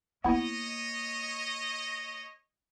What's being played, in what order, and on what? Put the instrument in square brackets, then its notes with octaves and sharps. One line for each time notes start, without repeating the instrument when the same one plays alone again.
[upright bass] A#3 [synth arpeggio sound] B3 E4 [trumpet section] C#5 D#5